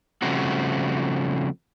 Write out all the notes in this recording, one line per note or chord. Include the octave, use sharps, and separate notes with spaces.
C#3 F3 G3 A3 C4 F#4